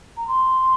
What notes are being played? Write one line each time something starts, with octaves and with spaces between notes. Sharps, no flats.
A#5
C6